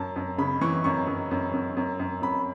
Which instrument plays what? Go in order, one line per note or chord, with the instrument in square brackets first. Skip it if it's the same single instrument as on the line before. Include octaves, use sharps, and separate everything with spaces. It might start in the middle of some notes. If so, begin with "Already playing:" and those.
Already playing: [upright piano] F#2 A5
F#2
C#3 B5
E3 C#6
F#2 C#6
F#2
F#2
F#2
F#2
F#2
F#2 B5